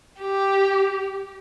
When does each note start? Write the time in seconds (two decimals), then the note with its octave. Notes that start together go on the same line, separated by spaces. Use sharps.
0.21 G4